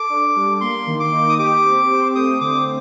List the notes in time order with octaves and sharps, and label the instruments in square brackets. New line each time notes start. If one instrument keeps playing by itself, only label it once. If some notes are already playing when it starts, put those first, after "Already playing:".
Already playing: [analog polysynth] A4 [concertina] D6
[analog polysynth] D4
G3
[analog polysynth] A#3 [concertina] C6
[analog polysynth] D#3
[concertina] D6
[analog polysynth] D#4
[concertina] D#6
[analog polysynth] G4 [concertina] D6
[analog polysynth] C4
C5
[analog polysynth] A3 [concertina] D#6
[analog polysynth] D3 [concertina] D6